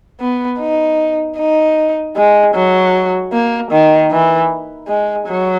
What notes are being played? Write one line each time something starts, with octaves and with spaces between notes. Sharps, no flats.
B3
D#4
D#4
G#3
F#3
A#3
D#3
E3
G#3
F#3